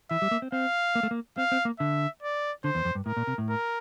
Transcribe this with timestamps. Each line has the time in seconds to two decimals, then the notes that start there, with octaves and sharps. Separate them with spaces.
0.10 E3 E5
0.22 G3
0.31 A#3
0.42 C4
0.52 C4 F5
0.95 A#3
1.03 A3
1.11 A#3
1.38 C4 F5
1.52 C4
1.65 A#3
1.79 D3 E5
2.23 D5
2.64 D3 C5
2.75 E2
2.85 F2
2.95 G2
3.06 A2 A#4
3.17 A#2
3.27 C3
3.38 A2
3.49 A#4